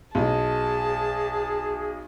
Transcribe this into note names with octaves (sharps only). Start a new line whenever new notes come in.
B1 G#4 D#5 A5